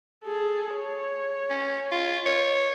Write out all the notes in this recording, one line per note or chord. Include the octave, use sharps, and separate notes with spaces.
G#4 A4
C#5
C#4
F4
C#5